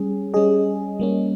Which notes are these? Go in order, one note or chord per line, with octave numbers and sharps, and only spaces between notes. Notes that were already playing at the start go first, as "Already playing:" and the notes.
Already playing: G3 C#4 G#4
G3 C#4 G#4 D#5
G3 A#3 C#4